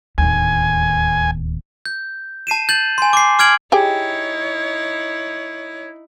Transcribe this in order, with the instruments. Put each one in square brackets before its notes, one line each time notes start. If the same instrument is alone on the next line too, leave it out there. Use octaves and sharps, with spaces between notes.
[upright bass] D1 D#2 [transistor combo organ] G#5
[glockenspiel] G6
A5 C7 D#7 E7
G6 A6 F#7
G#5 C6
D6 C7
D6 F6 G#6 D7 F#7
[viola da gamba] D#4 E4 [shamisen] G4 G#4 G5 [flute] C#5